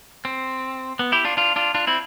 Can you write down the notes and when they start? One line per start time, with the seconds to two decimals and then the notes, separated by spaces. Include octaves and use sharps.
0.25 C4
0.99 B3
1.12 E4 G4
1.25 D4 F4
1.37 D4 F4
1.56 D4 F4
1.75 D4 F4
1.87 C4 E4